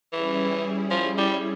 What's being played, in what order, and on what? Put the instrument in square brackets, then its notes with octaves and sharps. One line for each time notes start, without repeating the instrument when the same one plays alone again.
[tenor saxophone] E3 [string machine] G3 C#4 E4 G#4
[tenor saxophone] F3
G3